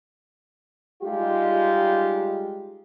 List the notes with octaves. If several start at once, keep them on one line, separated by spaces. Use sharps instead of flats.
G3 G#3 D#4 F4 G4